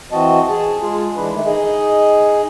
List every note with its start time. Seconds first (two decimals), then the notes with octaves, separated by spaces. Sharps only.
0.12 E3 C4 F#4 D#5 A5
0.49 G#4 A5
0.81 G#3 F4 G#4
1.16 E3 G#3 D4 B4
1.33 D#3 A3 D#4
1.45 D#4 G#4 D#5